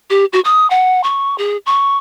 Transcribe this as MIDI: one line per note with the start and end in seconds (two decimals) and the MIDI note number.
0.10 0.25 67
0.33 0.40 66
0.45 0.69 87
0.70 1.03 78
1.04 1.36 85
1.38 1.57 68
1.66 1.98 85